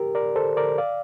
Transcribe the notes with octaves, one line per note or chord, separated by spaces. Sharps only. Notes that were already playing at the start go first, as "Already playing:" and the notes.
Already playing: G4 A#4
A#4 D5
A4 C5
A#4 D5
D5 F5